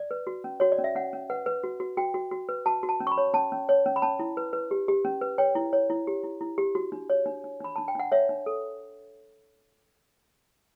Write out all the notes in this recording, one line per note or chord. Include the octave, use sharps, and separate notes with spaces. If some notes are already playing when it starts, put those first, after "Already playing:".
Already playing: D5
B4
F#4
C#4
F#4 C#5
D5
C#4
E5
C#4 F#5
C#4
B4 F#5
B4
F#4
F#4
F#4 G5
F#4
F#4
B4
F#4 A5
F#4
A5
C#4
C#6
B5
C#5
C#4 A5
C#4
C#5
C#4
B5
C#4 A5
E4
B4
B4
G4
G4
C#4
B4
C#5 G5
E4
C#5
E4
G4
E4
E4
G4
F#4
D4
C#5
D4
D4
D4 B5
D4 A5
G5
D4 F#5
C#5 E5
D4
A4